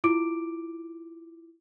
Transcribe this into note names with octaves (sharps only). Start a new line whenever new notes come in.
E4 F4 D6 D7